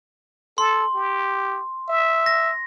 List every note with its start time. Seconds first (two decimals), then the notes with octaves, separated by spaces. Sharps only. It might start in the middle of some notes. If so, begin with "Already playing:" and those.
0.58 A4 C6
0.95 G4
1.89 E5
2.26 A#6